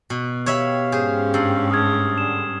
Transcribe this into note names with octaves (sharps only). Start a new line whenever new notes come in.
B2
G4 C#5 E5 F5 B5
G#2 C#4 G#4 C5
G2 E6 C7
A3 A5 D#6 F6 G#6
D3 G#4 E7